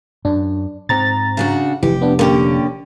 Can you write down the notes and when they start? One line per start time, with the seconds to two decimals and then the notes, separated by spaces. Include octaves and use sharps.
0.25 F#2 D4
0.89 G#2 C4 A#5 A6
1.37 C#3 D4 F#4
1.83 F1 E3 G4
2.01 B3 D4
2.19 D3 A#3 C#4 G4 D5